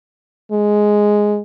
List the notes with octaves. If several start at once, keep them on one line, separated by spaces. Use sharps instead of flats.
G#3